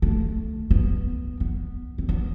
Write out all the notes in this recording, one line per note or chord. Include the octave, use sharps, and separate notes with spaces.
A3
B3
B3
C4
B3